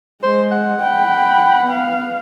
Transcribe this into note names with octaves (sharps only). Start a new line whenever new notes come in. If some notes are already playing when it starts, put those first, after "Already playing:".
G#3 C5
F#5
G5 B5
B3 F5